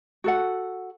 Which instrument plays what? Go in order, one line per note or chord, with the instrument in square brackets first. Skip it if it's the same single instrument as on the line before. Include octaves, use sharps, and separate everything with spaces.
[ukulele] F#4 A4 F#5